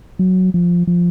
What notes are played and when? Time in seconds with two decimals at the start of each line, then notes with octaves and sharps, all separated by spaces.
0.19 F#3
0.54 F3
0.87 F3